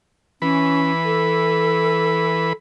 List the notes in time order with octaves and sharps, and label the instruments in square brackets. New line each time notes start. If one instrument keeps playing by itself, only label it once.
[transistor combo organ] E3 B4 B5 [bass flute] C#4
[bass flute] A4